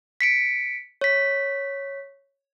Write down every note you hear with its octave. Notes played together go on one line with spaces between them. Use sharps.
B6 C#7 D7
C#5 B6